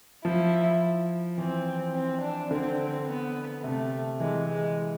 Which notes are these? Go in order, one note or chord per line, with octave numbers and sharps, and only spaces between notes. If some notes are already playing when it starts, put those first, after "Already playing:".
F3 E4
E3 C4
C4
D4
D3 C4
B3
C3 A3
E3 G#3
G#3